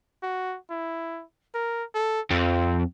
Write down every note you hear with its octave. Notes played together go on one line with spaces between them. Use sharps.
F#4
E4
A#4
A4
F2 C4